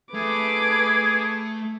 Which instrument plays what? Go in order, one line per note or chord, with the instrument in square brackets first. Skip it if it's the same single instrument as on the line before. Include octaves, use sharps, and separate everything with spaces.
[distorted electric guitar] A3 [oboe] G#4 [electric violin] B4 D6